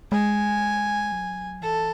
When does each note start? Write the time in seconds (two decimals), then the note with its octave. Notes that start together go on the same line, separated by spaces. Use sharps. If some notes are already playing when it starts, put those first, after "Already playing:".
0.12 G#3 G#5
1.12 F#3
1.62 E3 A4